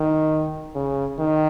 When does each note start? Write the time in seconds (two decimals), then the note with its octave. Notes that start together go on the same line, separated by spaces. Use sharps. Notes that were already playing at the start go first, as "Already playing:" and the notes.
Already playing: D#3
0.75 C#3
1.19 D#3